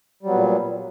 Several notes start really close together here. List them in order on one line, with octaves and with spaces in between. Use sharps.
G3 F#3 B3 A#2